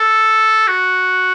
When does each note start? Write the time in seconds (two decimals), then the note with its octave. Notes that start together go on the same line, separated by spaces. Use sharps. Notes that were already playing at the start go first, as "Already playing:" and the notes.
Already playing: A4
0.67 F#4